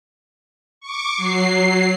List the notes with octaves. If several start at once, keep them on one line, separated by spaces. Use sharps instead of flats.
C#6 D6
F#3 C7